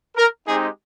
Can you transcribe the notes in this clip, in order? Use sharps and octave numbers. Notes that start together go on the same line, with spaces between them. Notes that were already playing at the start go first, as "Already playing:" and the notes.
A#4
G#3 C4 D#4 G4 G#4